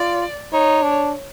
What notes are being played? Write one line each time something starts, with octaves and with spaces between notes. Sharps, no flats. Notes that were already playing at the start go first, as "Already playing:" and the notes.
Already playing: F4 D5
D#4 C#5
D4